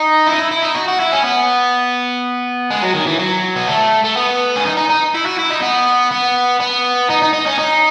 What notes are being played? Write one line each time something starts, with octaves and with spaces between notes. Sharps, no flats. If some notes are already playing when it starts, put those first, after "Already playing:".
Already playing: D#4
E4
D#4
E4
E4
D#4
F#4
F#4
E4
C#4
B3
G#3
F#3
D#3
E3
F#3
B3
A3
A3
B3
C#4
D#4
D#4
D#4
E4
F#4
E4
D#4
B3
B3
B3
D#4
D#4
D#4
C#4
D#4